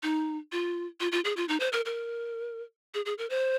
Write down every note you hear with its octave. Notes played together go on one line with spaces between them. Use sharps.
D#4
F4
F4
F4
G#4
F4
D#4
C5
A#4
A#4
G#4
G#4
A#4
C5